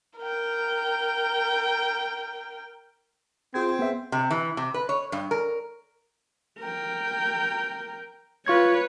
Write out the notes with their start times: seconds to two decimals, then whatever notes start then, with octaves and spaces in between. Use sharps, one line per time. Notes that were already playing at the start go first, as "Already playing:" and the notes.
0.18 A#4 G5
3.54 C4 F4 G#4 G#6
3.79 B3 G#4 E5
4.12 C3
4.31 E3
4.57 C3
4.74 B4
4.89 C#5
5.12 G2
5.31 A#4
6.60 A#4 G5
8.46 F4 B4 C#5 C#6 G#6